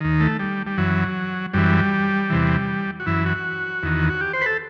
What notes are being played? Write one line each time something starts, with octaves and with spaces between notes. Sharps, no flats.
D#2 D#3
A3
G3
G3
F#2 E3 F#3
F#2 E3 G3
E2 C3 E3
F#4
F#2 E3 E4
F#4
E2 D#3
F#4
G4
C5
B4
A4